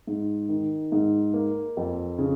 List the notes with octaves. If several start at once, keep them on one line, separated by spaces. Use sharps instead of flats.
G#2
D#3
G#2
A#3
F2
C#3